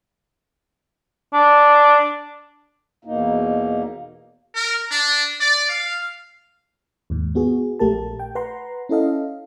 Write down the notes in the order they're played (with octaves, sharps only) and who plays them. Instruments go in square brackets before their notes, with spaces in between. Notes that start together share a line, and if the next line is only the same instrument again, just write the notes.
[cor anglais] D4
[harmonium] E2 B2 A#3 D#4
[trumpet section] A#4
D4
D5
F5
[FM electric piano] D#2 G#2
B3 F#4 G#4
A#1 A3 G4 A#4 A5
G5
B4 F#5 A#5 C6
C#4 E4 A4 D#5 F5